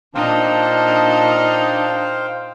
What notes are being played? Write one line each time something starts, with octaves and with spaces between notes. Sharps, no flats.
A#2 D4 D#4 C5 F5 G5